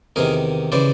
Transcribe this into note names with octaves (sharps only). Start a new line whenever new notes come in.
E2 C3 D#3 G#4 A#4
C#3 E3 C5 D5